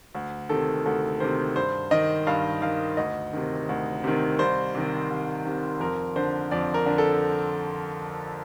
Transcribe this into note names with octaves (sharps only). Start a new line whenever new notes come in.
D2
C3 D#3 A4
D2 A4
C3 D#3 C5
G2 C5
D#3 D#5
G2 F5
D#3 F5
D2 D#5
C3 D#3
D2
C3 D#3
C2 C5
C3 D#3
C2
C3 D#3
F2 A#4
D3 C5
F2 D5
A#4
D3
A4